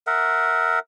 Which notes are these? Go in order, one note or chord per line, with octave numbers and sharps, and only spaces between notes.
A#4 E5 F#5